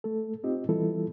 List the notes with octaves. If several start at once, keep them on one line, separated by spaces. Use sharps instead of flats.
A3 A4
C4 D#4 F4 G4 D#5
E3 G3 B3 E4 F4 A4